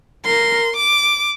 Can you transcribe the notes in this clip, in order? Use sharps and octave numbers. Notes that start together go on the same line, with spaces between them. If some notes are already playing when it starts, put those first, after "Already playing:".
A#4 C6
D6